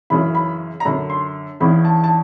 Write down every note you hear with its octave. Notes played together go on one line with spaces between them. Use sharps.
F#2 C#3 E3 B5
B5
A#5
F#2 D3 B5
C6
E2 C#3 E3 B5
A5
A5